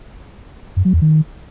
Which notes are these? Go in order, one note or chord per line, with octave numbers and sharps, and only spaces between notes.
F#2
F#3
E2
D#3